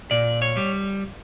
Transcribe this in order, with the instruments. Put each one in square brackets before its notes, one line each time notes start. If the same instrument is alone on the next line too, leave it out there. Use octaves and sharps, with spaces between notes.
[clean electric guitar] A#2 D5
C#5
G3